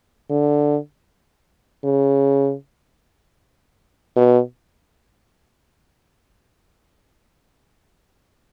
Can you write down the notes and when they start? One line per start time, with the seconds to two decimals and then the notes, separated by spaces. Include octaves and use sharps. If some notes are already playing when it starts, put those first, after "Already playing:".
0.30 D3
1.84 C#3
4.16 B2